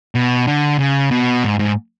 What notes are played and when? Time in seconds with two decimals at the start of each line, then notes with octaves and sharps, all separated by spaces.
0.15 B2
0.47 D3
0.79 C#3
1.11 B2
1.44 G#2
1.59 G#2